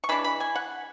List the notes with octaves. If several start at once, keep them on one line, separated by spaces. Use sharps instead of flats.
C#6
E3 G#3 D4 B5
B5
G#5
F#5